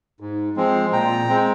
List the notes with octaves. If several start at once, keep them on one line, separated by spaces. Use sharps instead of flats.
G#2
F3 G#3 C4
A#2 G5 A#5
G#3 C4